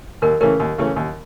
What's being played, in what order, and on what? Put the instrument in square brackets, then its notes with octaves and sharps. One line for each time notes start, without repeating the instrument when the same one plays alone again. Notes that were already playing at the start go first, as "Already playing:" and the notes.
[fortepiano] D#2 [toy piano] A#4
[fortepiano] C#3 E3 A3 C#4 [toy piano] A#4
[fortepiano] D#2
C#3 E3 A3 C#4
D#2